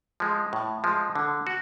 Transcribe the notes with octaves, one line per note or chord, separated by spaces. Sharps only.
F3 G#3
A2
F3 G#3
D3
F#4